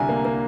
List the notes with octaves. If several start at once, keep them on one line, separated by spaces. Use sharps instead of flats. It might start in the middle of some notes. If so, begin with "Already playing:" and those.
Already playing: C2 D3 G#5
A#3
A#3